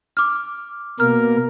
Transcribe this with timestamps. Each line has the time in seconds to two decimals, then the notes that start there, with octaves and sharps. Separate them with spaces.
0.17 D6 F6
1.00 B2 A#3 A#4 F6